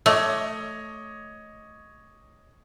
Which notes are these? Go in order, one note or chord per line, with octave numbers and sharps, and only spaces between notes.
A3 C#5 D#5 D6